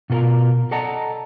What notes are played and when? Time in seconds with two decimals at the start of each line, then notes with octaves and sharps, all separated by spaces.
0.10 B2 F4 A4 A#4 A#5
0.71 A4 D5 D#5 F#5 A5 A#5